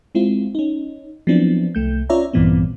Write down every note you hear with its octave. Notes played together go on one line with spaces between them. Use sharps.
G#3 C4 E4 F4
C#4 D#4
F3 F#3 B3 C4 D4 E4
C2 A3 G6
C#4 F4 C#5 D5 E5 A#5
A#1 G2 A#2 E3 B3 C4